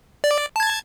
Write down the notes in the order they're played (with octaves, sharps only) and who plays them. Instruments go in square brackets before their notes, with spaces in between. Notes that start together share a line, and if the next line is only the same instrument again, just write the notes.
[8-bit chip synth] D5
A5 G#6